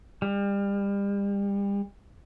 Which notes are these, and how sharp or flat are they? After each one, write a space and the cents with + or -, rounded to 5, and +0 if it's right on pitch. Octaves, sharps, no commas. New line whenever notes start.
G3 +35